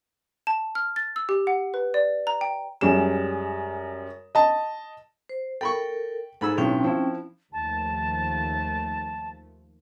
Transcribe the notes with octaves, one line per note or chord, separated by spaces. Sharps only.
A5
F6
A6
E6
G4
F#5
B4
D5
A#5
G5
F#2 G3 G#3 E7
D#5 A5
C5
A4 A#4 G5 B5 C#6
G#2 G#4 A4 B5 E6
B1 A2 C4 C#4 G5
F3 E4
D#2 F3 A3 A5